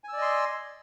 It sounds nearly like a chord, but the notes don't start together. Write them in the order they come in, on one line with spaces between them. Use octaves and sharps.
G#5 E6 D5 D#5 C6